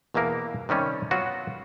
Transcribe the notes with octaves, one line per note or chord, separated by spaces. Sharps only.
E2 B2 E3 A#3 A#4
C3 D#3 G3 C#4
F#3 B3 F4 F#4